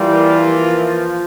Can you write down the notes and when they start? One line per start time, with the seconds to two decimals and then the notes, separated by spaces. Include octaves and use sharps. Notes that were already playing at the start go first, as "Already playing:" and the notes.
Already playing: E3 G3 A#3 F4
0.46 F3